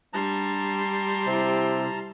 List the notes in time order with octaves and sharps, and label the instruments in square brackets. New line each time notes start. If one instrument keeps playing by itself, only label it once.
[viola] G3 C6 [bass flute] D4 [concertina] A5 A#5
[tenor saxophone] C3 [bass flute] E4